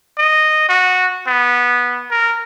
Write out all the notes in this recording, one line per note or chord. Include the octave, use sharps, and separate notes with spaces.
D#5
F#4
B3
A#4